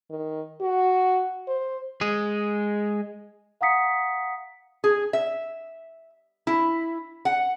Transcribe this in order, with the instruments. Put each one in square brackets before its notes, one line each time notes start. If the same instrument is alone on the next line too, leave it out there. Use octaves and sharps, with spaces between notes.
[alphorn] D#3
F#4
C5
[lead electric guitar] G#3 G#4
[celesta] F5 F#5 A#5 D#6 B6 C#7
[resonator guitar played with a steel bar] G#4
E5
E4
F#5